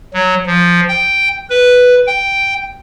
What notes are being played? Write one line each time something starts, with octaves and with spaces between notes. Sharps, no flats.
F#3
F3
G5
B4
G5